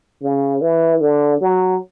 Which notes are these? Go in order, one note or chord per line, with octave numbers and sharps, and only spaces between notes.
C#3
E3
D3
F#3